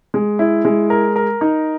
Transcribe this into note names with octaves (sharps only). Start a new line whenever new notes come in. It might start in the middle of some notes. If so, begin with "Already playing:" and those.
G#3
E4
G#3
A#4
A#4
D#4